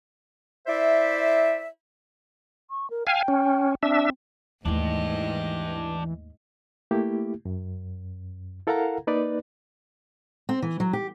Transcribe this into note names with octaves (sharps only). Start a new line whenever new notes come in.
E4 C5 D5 E5
C#6
A#4
F5 G5 G#5
C#4
C4 D4 E5
D#2 G#2 E3 A3 D4 G4 D#5
A3 A#3 E4 G4
F#2
E4 A4 A#4 F5 F#5 A#5
A#3 D#4 B4 D5
C4
E3
F#3
G4